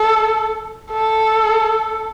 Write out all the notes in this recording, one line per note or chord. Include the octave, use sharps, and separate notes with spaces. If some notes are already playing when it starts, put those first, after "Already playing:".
Already playing: A4
A4